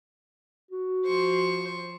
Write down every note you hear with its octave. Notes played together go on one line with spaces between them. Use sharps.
F#4
F3 C5 C#6